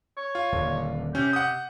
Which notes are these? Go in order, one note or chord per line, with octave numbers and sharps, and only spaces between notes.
C#5
F4
D#1 D3
C3 C#4 G4
F#5 D#6